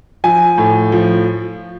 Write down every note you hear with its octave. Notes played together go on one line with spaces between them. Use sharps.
F3 G#5
A2
F3